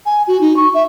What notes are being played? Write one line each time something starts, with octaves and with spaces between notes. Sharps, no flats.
G#5
F#4
D#4
C#6
E5